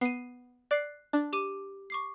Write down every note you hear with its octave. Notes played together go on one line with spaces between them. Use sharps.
B3 C7 D#7
D5 F#6 C7
D4
G4 D6 D#7
C#6 D6 C7